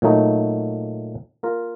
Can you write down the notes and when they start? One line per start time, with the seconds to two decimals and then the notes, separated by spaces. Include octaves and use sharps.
0.02 A#2 F#3 A3 D#4
1.43 A#3 F4 A#4